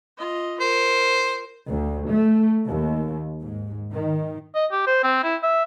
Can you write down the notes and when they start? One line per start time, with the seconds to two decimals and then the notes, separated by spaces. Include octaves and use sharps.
0.18 F4 D#5
0.61 A#4 C5
1.68 D2
2.09 A3
2.65 D#2
3.42 G#2
3.92 D#3
4.55 D#5
4.72 G4
4.87 C5
5.03 C4
5.23 E4
5.43 E5